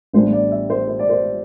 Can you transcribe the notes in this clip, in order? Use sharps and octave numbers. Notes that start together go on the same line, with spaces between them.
A1 A2 G3 B3 D4 C5
D5
E5
C5
C5
D5
C5